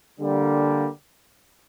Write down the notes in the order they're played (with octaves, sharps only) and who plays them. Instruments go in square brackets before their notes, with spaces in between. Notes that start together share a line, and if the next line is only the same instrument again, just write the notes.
[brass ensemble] D3 G3 A#3